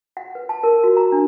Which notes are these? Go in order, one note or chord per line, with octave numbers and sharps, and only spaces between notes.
F#5
B4
A5
A#4
F#4
A#5
D4